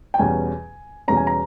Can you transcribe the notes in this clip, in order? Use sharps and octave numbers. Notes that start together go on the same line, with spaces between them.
G5
E2 B2 G3 C#4 G#5
E2 B2 G3 C#4 A#5
G#5
A#5